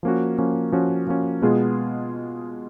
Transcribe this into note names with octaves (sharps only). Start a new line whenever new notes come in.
F3 A#3 C#4 F#4
F3 A#3 C#4 F#4
F3 A#3 C#4 F#4
F3 A#3 C#4 F#4
B2 G#3 B3 F4 G#4